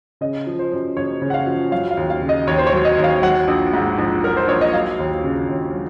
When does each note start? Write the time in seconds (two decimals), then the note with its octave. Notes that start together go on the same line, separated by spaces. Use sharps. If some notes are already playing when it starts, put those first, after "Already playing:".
0.21 C#3 D#5
0.47 F3
0.59 C5
0.72 F#2
0.96 F#1 C#5
1.22 C#3
1.30 F#5
1.34 F5
1.47 F3
1.72 F#3 F5
1.91 F5
1.97 D#2
2.10 F5
2.22 C#3
2.29 D#5
2.47 D#2 C#5
2.58 C5
2.67 C#5
2.73 F#3
2.85 D#5
2.98 D#2
3.04 F5
3.22 F#3 F#5
3.48 A#1
3.74 G#2
3.98 A#1
4.23 F#3 A#4
4.37 C5
4.48 A#1 C#5
4.61 D#5
4.73 F#3 F5
4.99 D#2
5.24 C#3
5.48 D#2
5.74 F#3